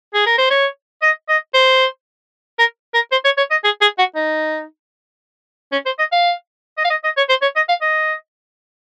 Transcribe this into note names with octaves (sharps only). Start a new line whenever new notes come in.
G#4
A#4
C5
C#5
D#5
D#5
C5
A#4
A#4
C5
C#5
C#5
D#5
G#4
G#4
F#4
D#4
C#4
C5
D#5
F5
D#5
F5
D#5
D#5
C#5
C5
C#5
D#5
F5
D#5